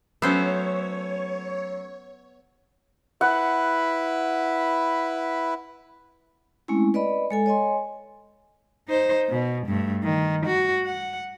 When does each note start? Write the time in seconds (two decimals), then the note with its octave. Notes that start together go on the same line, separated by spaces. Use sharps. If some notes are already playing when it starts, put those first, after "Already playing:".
0.22 F#3 A3 B3 C#4 C5 C#5 E6
3.21 E4 B4 F#5
6.68 G#3 A3 C4 C#4 E4
6.94 B4 D5 D#5 B5
7.30 G#3 A4 G#5
7.46 C#5 D#5 G#5 C6
8.88 D#4 C5
9.29 B2
9.67 G2 A3
10.04 D#3
10.47 F#4
10.86 F#5